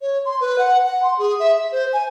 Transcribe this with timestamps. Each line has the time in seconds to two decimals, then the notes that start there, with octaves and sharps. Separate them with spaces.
0.01 C#5
0.25 C6
0.41 B4
0.58 F#5
0.87 F#5
1.03 C6
1.18 G#4
1.40 E5
1.57 E5
1.72 C5
1.93 G#5